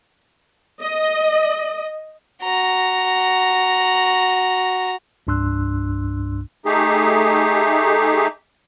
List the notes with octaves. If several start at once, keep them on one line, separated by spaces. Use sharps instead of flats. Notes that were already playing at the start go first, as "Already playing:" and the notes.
D#5
F#4 A#5
C2 G2 D4 C6 E6 F#6
A3 D#4 G4 G#4